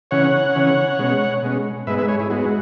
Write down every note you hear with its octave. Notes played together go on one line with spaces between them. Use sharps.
C#3 E3 C#4 C#5 F#5
C#3 E3 C#4
B2 G#3 C#4
B2 G#3 C#4
G#2 G#3 B3 B4 E5
B4 E5
G#4 C#5
E4 G#4
G#2 G#3 B3 F#4